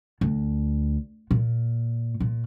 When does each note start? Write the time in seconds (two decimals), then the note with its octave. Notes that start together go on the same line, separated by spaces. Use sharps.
0.21 D2
1.31 A#2
2.20 A#2